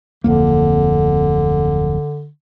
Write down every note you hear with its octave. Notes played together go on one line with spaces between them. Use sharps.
D1 F2 D3 A#3